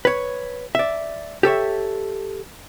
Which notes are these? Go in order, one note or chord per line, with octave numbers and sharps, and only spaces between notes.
B4 C#5
D5 E5
G4 A4 C#5 E5